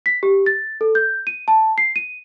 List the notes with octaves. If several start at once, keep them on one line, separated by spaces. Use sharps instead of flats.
B6
G4
A6
A4
G6
D#7
A5
C7
D#7